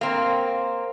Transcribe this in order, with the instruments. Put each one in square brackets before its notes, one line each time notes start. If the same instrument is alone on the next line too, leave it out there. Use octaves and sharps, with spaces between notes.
[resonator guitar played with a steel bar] A#3 C4